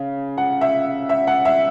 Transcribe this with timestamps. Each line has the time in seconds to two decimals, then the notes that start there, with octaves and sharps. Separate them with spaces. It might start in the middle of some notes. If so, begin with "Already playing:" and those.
Already playing: C#3
0.38 F#5
0.61 E5
1.09 E5
1.27 F#5
1.45 E5